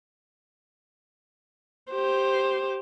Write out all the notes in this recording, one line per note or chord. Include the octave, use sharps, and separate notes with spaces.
G4 C5